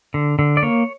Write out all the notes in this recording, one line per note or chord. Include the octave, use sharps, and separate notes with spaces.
D3
D3
D5
A#3 C#5